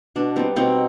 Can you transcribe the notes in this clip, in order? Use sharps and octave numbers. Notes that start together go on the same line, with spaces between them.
B2 D4
G3 B3 C4 D#4
B2 C4 D#4